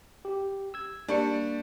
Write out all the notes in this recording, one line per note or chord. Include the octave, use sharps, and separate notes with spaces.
G4
E6 G#6
G3 A#3 D4 C#6 C#7